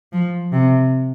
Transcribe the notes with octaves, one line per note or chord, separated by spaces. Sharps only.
F3
C3